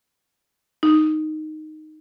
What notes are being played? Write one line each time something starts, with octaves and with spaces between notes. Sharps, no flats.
D#4